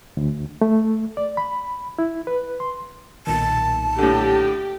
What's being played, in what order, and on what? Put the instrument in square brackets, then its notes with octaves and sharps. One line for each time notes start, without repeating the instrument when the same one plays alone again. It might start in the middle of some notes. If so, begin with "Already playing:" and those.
[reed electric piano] D2
A3
D5
B5
E4
B4
C6
[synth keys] B1 A#2 D#3 [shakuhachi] A5
[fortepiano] A2 D3 [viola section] G4